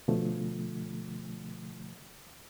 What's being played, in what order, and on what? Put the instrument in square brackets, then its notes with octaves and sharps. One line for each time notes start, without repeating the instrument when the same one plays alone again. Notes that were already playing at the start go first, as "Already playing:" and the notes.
[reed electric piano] B2 D3 F3 A3